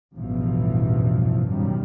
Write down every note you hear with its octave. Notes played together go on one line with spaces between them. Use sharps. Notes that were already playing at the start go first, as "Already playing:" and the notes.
A1 E2 G2 B2 E3 F3
F#2 B2 D#3 G3